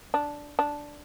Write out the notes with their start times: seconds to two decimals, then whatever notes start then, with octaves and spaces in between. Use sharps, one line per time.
0.14 D4
0.59 D4